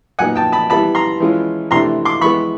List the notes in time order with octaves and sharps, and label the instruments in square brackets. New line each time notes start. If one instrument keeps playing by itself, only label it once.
[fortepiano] A#2 F#3 B3 D#4 F#5 G#5
G5 A5
A5 B5
E3 G3 B3 E4 A5 B5
A#5 C6
E3 G#3 C#4 F4
C3 E3 A3 D4 A#5 C6
C6 D6
E3 G#3 B3 B5 C#6